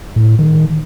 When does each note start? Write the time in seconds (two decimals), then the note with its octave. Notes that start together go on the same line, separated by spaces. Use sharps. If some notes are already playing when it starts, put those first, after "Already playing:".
0.16 A2
0.39 D#3